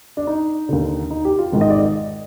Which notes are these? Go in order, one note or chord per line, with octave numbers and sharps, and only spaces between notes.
D4
D#4
D#2 D3
D#4
G4
F4
G#1 G#2 D#3
D#5
D5
D#5